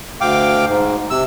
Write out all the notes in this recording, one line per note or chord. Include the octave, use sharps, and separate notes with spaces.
D2 F5 G5 D6
G#2
C3 E6